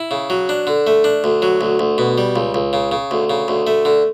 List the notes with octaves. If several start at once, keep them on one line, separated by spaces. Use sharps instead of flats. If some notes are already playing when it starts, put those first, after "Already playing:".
Already playing: E4
C#3
F#3
D4
D3
A3
D4
D2
F#3
D2
D2
B2
G3
C#2
C#2
C#3
C#3
D2
C#3
D2
A3
D3